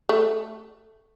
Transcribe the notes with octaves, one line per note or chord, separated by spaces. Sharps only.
A3